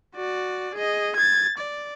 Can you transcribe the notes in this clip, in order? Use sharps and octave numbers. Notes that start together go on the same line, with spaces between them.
F#4 D5
G#4 D#5
G#6 A6
D5